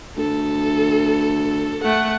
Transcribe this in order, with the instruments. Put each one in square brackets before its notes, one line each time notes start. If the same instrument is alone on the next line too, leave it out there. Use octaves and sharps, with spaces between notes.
[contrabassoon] D2 [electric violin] A4
[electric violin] A3 F#5